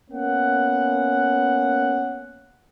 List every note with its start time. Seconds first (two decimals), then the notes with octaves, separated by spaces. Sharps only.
0.11 A#3 B3 C#4 F#5